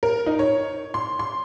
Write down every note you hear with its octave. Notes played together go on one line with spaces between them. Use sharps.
A#4
D#4
C#5
C6
C6